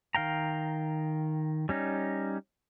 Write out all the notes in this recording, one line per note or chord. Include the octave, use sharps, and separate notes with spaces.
D#3 F5 G5 A#5
G3 C#4 D#4